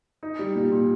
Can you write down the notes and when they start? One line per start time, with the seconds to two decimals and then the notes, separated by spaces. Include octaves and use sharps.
0.23 D#4
0.39 G3
0.55 A#2
0.72 A#2